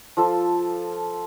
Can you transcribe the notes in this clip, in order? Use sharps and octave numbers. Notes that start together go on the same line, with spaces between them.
F3 F4 A4